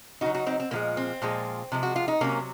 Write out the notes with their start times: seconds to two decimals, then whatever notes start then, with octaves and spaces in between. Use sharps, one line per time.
0.21 C#3 F#3 D#4 F#4
0.34 D#4 F#4
0.47 C4 D#4
0.60 C4
0.71 A#2 F3 G#3 A#3
0.97 C4
1.22 A#2 F3 G#3
1.72 C3 F3 G#3
1.83 F#4
1.96 F4
2.08 D#4
2.21 C3 F#3 A#3 C#4